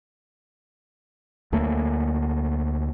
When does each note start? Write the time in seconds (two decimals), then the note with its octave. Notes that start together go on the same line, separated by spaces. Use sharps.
1.52 D2 F#3 A3 A#3